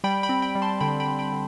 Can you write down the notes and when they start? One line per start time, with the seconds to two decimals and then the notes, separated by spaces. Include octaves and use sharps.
0.04 G3 G5 B5
0.23 G5 B5
0.29 C4
0.42 G5 B5
0.55 G3
0.62 A5 C6
0.80 D3 G5 B5
1.00 G5 B5
1.06 D3
1.19 G5 B5
1.32 D3